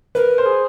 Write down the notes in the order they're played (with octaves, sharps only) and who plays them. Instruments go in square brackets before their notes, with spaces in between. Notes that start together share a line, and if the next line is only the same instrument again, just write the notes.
[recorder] A#4 [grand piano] B4
[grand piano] C5
[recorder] G#4